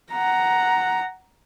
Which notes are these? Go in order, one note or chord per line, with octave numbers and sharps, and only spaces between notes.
F#5 A#5